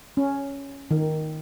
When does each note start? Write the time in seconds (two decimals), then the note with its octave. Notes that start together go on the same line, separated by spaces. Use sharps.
0.17 C#4
0.91 D#3